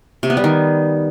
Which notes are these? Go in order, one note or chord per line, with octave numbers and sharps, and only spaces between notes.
C3
B3
G3
D#3